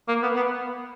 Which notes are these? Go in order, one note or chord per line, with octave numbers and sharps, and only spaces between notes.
A#3
B3
B3